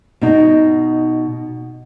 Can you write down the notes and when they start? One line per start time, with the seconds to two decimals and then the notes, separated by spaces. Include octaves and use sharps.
0.21 B2 D#4